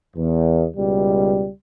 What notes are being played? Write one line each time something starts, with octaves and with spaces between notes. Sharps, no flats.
E2
C#2 B2 G3